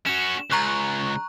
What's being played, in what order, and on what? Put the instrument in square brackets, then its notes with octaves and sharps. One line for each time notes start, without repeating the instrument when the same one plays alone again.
[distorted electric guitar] C#4 F#4 [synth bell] E7
[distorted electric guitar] C#2 [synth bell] A#5 C#6 F#6